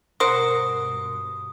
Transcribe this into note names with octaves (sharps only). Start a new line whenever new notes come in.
G2 B2 A#4 C5 F#5 D#6